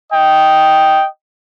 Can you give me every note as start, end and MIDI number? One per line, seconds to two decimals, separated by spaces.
0.13 1.08 75
0.13 1.08 79